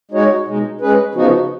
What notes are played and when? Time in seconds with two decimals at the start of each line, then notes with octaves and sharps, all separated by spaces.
0.11 G#3 D#4 F#4 C#5
0.46 B2 G#3 D#4
0.81 G#3 C#4 G#4 B4
1.14 C#3 F3 B3 D#4 F#4